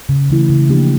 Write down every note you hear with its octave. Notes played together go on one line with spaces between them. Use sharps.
C#3
E3 A3 E4
C#3
F3 A#3 D4 G4